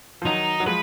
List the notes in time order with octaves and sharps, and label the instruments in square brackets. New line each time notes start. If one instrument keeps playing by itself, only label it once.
[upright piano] F3
[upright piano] D#3 F#3 [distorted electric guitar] D#4
[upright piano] F#3
[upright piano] F3 G#3 [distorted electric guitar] B4